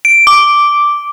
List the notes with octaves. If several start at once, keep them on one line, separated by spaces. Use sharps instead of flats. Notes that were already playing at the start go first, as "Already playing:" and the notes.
D7
D6